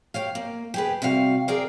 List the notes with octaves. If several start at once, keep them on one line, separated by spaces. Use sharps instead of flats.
G4 C#5 F5
A#3
G4 G#4 B4
C3 G3 F#4 F5
G#4 A#4 D5 F5 G5